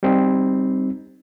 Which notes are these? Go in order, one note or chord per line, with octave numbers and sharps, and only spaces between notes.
G3 C4 D#4